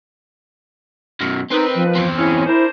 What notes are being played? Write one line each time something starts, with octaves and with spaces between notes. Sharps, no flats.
F#2 B2
D#3 C4 D#4 B4
F3
E2 C4
C#3 C#4 E4
D4 E4 A#4 C5